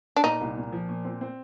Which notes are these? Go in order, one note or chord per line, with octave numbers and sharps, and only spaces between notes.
D4
A#2 D#4
C2
A#2
F3
A#2
C4
C4